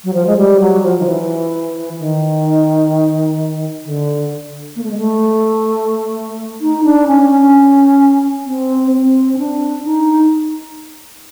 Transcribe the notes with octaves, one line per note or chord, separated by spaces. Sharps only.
F#3
F3
G#3
G3
F#3
F3
D#3
E3
D#3
D3
A#3
A3
G#3
A3
D#4
D4
C#4
C#4
C4
C4
C#4
D4
D#4